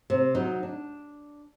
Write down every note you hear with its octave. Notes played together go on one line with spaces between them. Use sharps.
C3
F#3 D#4
D4